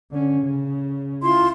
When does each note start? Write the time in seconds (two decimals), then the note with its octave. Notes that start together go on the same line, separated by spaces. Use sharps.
0.11 D3 C#4
0.41 C#3
1.22 E4 F4 C6